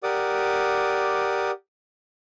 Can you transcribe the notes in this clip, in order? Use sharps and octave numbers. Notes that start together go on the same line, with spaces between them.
G4 A#4 D5 F#5 D6 D#6